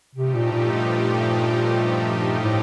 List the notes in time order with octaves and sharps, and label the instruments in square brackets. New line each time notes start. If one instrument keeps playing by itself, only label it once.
[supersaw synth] G2 F3 A3 D#4 G4 [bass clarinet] C3
[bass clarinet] A#2
A#2
A#2
A2